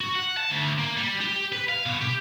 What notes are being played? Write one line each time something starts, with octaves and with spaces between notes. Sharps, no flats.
F#4
F#5
A5
D2
A#3
G3
G4
B4
F5
B2
G4